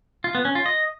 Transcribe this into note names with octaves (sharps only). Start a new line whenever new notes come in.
F4
B3
C#4
F4
D#5